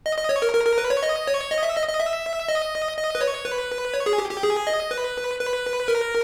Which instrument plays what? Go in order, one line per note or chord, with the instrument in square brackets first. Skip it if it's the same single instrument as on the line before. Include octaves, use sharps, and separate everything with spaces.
[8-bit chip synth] D#5
D#5
C#5
A#4
A#4
A#4
B4
C#5
D#5
C#5
D#5
E5
D#5
D#5
E5
D#5
D#5
B4
C#5
B4
C#5
G#4
G4
G4
G#4
D#5
B4
B4
A#4